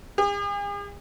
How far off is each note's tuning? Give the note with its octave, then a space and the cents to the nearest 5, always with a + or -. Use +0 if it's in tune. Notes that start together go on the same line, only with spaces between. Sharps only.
G#4 -45